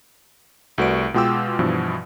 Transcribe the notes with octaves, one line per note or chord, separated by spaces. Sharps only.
C2 A3 F#4 B4 D5 D7
B2 G#3 F4 G5 D6 E6
G2 B2 E3 F3